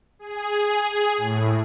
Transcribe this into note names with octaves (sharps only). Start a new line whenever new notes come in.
G#4
A2